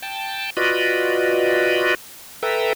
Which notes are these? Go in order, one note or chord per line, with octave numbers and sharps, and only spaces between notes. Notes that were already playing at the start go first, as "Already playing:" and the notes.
G5 A5
F4 F#4 B4 D5 D#5
A4 B4 E5 G5 A#5